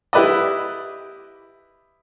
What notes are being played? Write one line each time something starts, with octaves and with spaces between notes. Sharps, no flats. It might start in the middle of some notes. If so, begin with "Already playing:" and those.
E4 G4 B4 D5 D#5